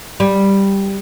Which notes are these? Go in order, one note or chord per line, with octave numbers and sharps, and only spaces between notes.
G3